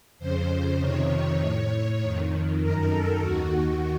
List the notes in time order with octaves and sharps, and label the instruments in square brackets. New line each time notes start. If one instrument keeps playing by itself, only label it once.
[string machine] F2 C#3 C5
F2 C3 D#3 C#5
A2
F2 D#3
F#2 D#3 A#4
A4
D#2 D#3 F#4